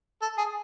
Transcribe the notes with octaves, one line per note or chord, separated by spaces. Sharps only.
A4
G#4